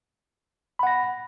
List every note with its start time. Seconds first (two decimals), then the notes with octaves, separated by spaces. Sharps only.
0.79 B5
0.83 F#5
0.87 A#6